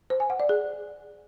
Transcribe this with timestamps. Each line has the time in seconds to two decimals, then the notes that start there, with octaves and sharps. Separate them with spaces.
0.10 C5
0.20 G#5
0.30 F#5
0.40 D5
0.49 G#4